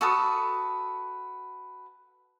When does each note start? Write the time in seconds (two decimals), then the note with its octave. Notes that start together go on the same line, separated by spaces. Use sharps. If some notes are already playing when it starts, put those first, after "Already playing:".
0.01 F#4 A4 B4 D#6